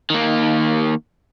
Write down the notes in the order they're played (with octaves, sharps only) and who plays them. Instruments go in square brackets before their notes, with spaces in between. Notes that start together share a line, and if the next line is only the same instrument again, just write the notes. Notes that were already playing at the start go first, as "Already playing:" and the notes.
[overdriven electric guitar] D#3 A#3